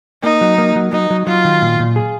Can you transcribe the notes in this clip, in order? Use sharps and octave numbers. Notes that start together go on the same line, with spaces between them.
A#3 D#4
F#3
A#3
F#3
F#3 D#4
F#3
F#3 F4
D#3
A#2
A#2
G#4